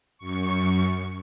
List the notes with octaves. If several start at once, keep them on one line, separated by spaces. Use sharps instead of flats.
F#2 C#6